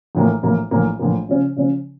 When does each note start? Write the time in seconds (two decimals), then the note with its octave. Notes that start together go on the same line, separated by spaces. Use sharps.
0.15 A#1 A2 E3 A#3
0.43 A#1 A2 E3 A#3
0.71 A#1 A2 E3 A#3
0.99 A#1 A2 E3 A#3
1.29 C#3 F3 C#4
1.56 C#3 F3 C#4